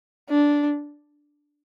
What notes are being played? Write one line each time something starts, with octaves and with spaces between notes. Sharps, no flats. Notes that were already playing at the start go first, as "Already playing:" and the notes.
D4